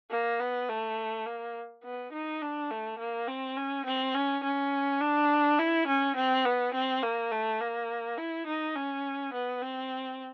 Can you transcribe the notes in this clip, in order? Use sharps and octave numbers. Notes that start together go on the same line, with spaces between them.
A#3
B3
A3
A#3
B3
D#4
D4
A3
A#3
C4
C#4
C4
C#4
C#4
D4
E4
C#4
C4
B3
C4
A#3
A3
A#3
E4
D#4
C#4
B3
C4